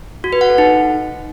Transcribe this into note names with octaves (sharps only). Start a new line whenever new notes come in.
F#4
B4
F#5
A4
D#4